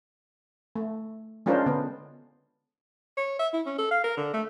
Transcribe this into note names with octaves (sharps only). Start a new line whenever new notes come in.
A3
G#3 C#4 D4 F4 A#4 C5
D3 B3
C#5
E5
E4
C#4
A4
F5
A#4
D3
A3